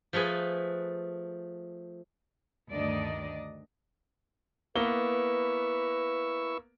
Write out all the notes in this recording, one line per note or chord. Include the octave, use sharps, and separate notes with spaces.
F3 A3 G#4 B4 G#5
D2 G2 D#3 D4 D5 D#5
A#3 B3 E4 B4 C#6 E6 G7